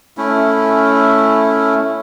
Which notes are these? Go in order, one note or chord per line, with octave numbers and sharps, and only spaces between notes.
A3 C#4 E4